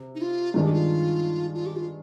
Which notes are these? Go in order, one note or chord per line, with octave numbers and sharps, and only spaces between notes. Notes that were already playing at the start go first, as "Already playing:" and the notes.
Already playing: C3
D#4
F4
G2 D#3 G#3 D4 F4
G4
F4
F4
G4
F4